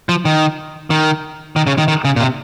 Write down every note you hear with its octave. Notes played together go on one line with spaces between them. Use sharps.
F3
D#3
D#3
D#3
C#3
D#3
D#3
C#3
A#2
C3